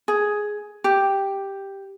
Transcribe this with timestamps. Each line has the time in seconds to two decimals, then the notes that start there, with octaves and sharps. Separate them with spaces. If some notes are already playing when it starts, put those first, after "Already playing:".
0.08 G#4
0.84 G4